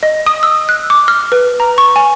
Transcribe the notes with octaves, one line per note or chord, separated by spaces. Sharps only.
D#5
D#6
E6
F#6
D6
F6
B4
A#5
C#6
G#5